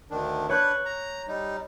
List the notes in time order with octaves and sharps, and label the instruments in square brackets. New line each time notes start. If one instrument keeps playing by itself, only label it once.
[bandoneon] D2 D#3 D4
[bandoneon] D4 B4 [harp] C#5 F#6 G6
[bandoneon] A#5
G3 D#4